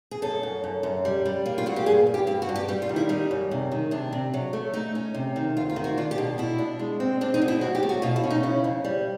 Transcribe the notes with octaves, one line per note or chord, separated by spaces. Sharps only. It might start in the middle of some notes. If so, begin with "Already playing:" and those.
G#4
F#2 A4
F#2
F#2
F#2
G3
G3
A#3
F4
A#2 F#4
G4
G2 G#4
G2
G4
G2 G4
F#4
G2
G4
G3 G4
F4
D#3
E4
G3 D#4
F#2
C3
D#3
C3 D4
C3
F#3
A3
A3 D#4
C#4
C3
D#3
D2 F4
F4
D#3
F#4
D4 F4
G4
B2
B2 E4
D4
G#3
C4
C4 D4
D#4
B2
E4
F#3 F#4
G4
A3
F#4
B2 F4
E4
C#4
D#4
C#3 E4
F2
G3